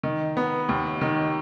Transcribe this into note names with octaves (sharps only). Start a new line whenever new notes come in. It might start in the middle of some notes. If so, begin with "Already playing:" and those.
D#3
B3
D#2
D#3